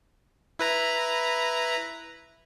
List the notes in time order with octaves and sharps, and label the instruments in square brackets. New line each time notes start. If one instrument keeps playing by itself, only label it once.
[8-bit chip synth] E4 B4 A#5